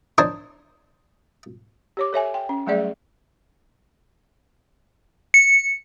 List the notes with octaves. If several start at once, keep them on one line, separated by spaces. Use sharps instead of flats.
D4 D#4 C5 C#5
G4 C#5 D6
A4 C#5 E5 G#5
G5
C#4
F#3 G3 A3 G#4 D5 E5
C#7